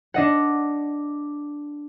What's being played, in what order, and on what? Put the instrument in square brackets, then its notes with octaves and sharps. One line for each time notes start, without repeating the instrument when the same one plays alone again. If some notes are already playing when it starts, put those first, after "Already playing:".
[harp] D4 D#5 F#5